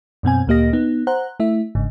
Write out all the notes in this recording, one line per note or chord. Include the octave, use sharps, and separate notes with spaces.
F#2 B2 C4 G#5
D2 A#2 A#3 G4 D#5 A#6
B3 D#4
C5 F#5 A#5 F#6
A3 E4 E5
G1 G#2 C#3